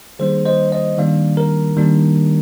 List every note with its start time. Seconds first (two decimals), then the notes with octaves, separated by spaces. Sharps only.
0.19 D#3 G3 A#3 D4 G#4 C5
0.45 C5 D#5
0.72 C5 D#5
0.98 D#3 G3 A#3 D4 D5 F5
1.37 A#4
1.77 D#3 G3 A#3 D4